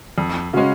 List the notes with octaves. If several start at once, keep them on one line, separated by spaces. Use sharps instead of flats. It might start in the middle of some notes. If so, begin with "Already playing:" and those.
F2
C#3 G#3 C#4 F#4